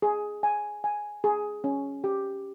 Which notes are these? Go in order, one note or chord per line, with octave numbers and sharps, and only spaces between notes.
G#4
G#5
G#5
G#4
C#4
G4